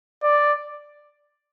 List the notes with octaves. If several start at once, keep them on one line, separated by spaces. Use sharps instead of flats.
D5